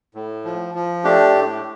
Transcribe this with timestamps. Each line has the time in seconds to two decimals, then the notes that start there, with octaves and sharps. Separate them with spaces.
0.15 A2
0.45 F3
0.75 F3
1.04 A3 D4 G4
1.35 A2